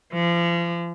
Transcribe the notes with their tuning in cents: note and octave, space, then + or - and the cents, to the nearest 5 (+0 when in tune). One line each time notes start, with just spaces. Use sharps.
F3 -35